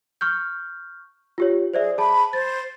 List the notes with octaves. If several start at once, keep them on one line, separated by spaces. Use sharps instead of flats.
C#6 F6 G6
F4 G4 C#5
G#4 C5 D5 E5
G#4 A5 B5
C5 A6